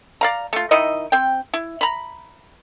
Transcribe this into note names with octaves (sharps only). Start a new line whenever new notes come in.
D5 F5 A#5
A3 F4
D#3 D#4 E4 D#5
C4 G5
E4
A#5 B5